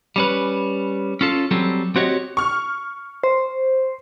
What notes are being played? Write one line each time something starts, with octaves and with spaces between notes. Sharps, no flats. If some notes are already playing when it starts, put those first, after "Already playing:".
G3 C#4 B4
C#4 F4 A4
F#3 G3 C4 A4
C4 F#4 G4 C#5 D#5
C#6 F6
C5